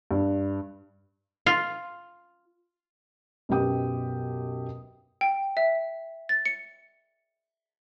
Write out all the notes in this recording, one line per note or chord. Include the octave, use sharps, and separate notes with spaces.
G2
F4
B1 F#2 B2 G4 G5 D#6
G5
E5
A6
C#7